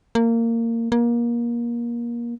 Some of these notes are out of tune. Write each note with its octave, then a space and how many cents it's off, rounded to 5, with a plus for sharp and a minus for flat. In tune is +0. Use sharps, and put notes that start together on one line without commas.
A#3 -20
A#3 +25